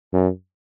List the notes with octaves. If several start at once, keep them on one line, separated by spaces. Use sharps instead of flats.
F#2